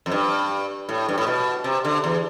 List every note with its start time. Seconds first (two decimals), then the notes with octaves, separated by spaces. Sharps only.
0.06 F2
0.12 G2
0.89 A2
1.08 G2
1.18 A2
1.27 B2
1.64 C3
1.85 D3
2.04 E2